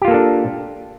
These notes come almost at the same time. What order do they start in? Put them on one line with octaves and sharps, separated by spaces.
G4 F4 A#3 A4 D4